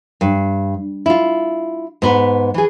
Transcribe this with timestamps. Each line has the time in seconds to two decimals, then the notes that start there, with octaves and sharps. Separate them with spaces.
0.21 G2
1.06 E4 F4
2.02 G#2 B3 B4
2.54 E3 G#4